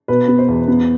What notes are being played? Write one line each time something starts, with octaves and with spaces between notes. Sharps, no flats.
B2 B4
B3
C5
E2
B3